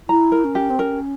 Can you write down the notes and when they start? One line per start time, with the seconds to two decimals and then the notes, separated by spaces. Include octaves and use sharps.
0.09 E4 A#5
0.32 A#4
0.44 C#4
0.55 G4
0.70 C4
0.79 C#4 A#4